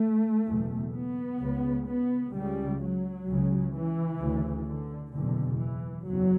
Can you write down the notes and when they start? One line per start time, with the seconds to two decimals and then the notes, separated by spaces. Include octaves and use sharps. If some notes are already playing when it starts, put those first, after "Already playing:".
Already playing: A3
0.46 F#1 E2 B2
0.92 B3
1.39 C#2 C#3
1.86 B3
2.32 C#2 C#3 G3
2.79 F#3
3.26 C#2 C#3
3.74 E3
4.20 D2 C#3
4.66 D3
5.13 F#1 E2 B2 D3
5.61 E3
6.07 F#1 E2 F#3